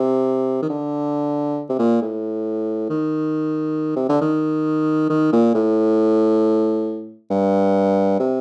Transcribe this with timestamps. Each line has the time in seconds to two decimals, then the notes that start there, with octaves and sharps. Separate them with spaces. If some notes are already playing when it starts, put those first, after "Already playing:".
Already playing: C3
0.62 D#3
0.70 D3
1.69 C3
1.79 A#2
2.02 A2
2.90 D#3
3.96 C3
4.09 D3
4.21 D#3
5.10 D#3
5.33 A#2
5.55 A2
7.30 G2
8.20 C3